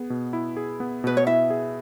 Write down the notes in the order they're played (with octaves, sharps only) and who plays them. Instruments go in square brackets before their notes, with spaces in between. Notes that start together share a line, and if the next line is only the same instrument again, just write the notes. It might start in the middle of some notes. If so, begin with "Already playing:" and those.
Already playing: [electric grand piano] B3 G#4
B2
E4
G#4
B3
[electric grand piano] B2 [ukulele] B4
[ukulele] C#5
[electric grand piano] E4 [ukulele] E5
[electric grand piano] G#4